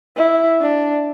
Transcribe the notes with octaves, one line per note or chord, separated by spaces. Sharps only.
E4
D4